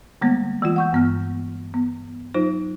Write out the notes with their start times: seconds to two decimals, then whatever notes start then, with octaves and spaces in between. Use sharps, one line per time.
0.21 D3 G3 G#3 A#3 B3
0.62 E3 G#3 F4
0.76 F#5 C#6 G6
0.93 G2 B3 F6
1.74 B3
2.34 F#3 D#4 F4 C5